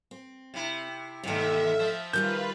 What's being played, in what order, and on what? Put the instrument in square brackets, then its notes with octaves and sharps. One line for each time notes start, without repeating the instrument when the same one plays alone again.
[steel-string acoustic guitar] C4
[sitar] C3 E4
[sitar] D#2 C3 [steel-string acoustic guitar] G#2 A3 [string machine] E5
[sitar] F3 C5
[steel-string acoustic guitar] D#3 G3 G#4 [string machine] F4 B4 [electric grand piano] G6